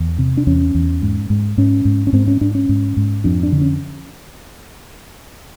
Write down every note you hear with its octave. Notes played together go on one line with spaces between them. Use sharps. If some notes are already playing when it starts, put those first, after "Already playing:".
Already playing: E2
C3
D4
E2 C#4
E2
G#2
G#2
G#2 C#4
G#2
C#4
G#2 C4
C#4
G#2 D4
C#4
G#2
G#2
F2 D4
D4
D3
C#4